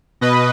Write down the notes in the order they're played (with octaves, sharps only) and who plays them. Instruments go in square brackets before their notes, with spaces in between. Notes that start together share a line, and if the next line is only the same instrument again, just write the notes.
[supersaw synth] B2 B4 D#5